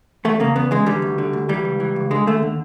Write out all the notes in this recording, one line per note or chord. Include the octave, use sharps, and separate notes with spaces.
E2 A3
C#3 A#3
E2 B3
E3 G#3
D3 G3
D2
D3
D2
E3 G3
C#2
E3
C#2
D3 G#3
D#2 A3
D3